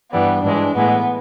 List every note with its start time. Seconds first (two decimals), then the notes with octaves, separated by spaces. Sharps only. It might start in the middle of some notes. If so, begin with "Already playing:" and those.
0.12 G2 E3 G3 B3
0.43 G#2 E3 G#3 D4
0.75 A2 E3 G#3 B3